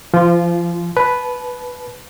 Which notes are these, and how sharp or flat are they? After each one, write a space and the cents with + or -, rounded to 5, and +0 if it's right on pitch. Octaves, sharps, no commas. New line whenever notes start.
F3 -30 F4 -10
B4 +0 A5 -30